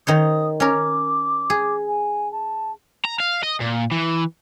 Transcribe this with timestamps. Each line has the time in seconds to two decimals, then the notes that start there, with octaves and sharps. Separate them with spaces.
0.07 D#3 C5 C#5 D#6
0.60 C#4 A#4 D6
1.50 G#4
1.87 G#5
2.32 A5
3.05 A#5
3.20 F5
3.43 D#5
3.61 A#2
3.92 E3